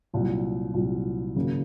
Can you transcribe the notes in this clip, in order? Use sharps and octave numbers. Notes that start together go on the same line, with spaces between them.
C2 A#2 F#3
C2 A#2 F#3
G#1 F#2 C#3 F#3 A#3